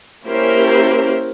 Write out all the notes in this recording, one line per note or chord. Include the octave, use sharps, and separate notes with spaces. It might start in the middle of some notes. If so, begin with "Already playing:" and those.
A#3 C#4 E4 G4 A#4 C5